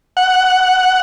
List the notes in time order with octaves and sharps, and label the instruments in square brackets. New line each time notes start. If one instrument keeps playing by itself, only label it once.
[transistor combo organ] F#5